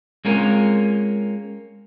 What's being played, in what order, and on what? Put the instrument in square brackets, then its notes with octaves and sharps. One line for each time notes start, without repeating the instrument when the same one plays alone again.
[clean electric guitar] G#3 A#3 C4 C#4 F4 A#4